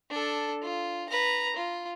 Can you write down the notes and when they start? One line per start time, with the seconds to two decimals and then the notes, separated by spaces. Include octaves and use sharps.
0.10 D4 A4
0.62 F4
1.09 B4 A#5
1.56 F4